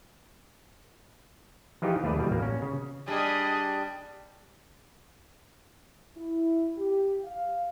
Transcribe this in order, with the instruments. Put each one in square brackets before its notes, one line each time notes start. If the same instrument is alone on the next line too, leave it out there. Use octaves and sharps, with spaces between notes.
[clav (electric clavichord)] E3 F3 D#4 F4 G4 G#4
D#2 A3 G#4 B4 D5
E2 B2 G3
A1 A#3
C#4
C#3
[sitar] G3 [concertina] D4 [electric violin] G#4 D#5
[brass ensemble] E4
G4
F5